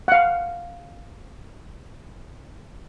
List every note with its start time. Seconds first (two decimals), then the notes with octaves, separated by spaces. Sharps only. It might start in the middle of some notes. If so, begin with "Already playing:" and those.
0.08 F5 F#5